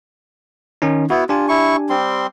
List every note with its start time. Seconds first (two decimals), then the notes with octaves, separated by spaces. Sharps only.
0.82 D#3 C#4 D#4
1.10 B3 E4 F#4
1.29 D4 F4 G4 G#5
1.49 E4 C#6
1.90 G3 C4 C6